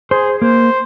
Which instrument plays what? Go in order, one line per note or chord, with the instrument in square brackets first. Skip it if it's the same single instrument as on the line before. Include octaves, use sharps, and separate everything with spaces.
[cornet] G#4 [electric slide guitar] C5
[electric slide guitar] A#3 [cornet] C5